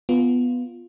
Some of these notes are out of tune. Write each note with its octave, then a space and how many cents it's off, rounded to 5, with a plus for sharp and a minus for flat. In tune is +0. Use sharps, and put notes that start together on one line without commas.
B3 +0 F4 +0